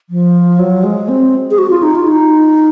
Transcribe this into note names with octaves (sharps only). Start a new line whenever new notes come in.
F3
F#3
G#3
C4
G#4
F#4
F4
D#4
F4
D#4